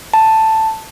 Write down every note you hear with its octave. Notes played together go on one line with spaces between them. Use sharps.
A5